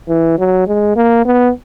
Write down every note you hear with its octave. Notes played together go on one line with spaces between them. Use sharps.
E3
F#3
G#3
A#3
B3